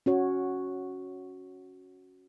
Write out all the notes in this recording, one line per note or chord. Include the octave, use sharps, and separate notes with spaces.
C#4 F#4 C#5